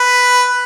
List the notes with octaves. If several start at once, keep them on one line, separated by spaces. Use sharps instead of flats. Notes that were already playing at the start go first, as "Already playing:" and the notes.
Already playing: B4